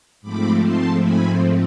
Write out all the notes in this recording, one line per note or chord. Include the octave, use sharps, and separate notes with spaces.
G#2 F3 A3 C4 B5 D6
A5 C6
G#5 B5